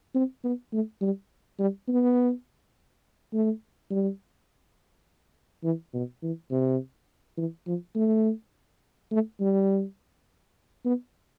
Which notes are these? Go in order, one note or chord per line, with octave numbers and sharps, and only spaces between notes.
C4
B3
A3
G3
G3
B3
A3
G3
E3
B2
E3
C3
E3
F3
A3
A3
G3
B3